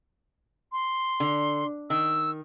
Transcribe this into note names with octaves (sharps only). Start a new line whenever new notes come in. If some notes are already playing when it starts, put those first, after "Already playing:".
C6
D3
D#3 E6